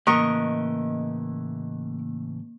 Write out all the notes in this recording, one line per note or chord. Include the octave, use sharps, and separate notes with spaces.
A2 C#3 E3 A#3 A#4 D#5 C#6